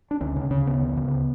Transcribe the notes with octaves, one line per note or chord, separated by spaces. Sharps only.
D4
D2 C#4
C#3 C#4
C#3 C#4
D2 B3
D2
C#3